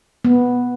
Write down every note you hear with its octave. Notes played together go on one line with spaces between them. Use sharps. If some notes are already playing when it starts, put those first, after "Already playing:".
B3